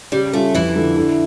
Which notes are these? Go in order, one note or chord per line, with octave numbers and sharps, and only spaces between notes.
C#3 G3
G3 A3 C#4 F4 A4
F2 E3 E4
D3 F3
D3